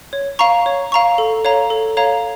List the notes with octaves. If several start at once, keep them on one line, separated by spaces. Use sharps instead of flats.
C#5
F5 A#5 C#6
C#5
F5 A#5 C#6
A4
C#5 F5 A#5
A4
C#5 F5 A#5